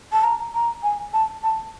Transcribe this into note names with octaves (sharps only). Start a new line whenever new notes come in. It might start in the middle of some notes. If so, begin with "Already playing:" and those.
A5
A#5
A#5
G#5
A5
A5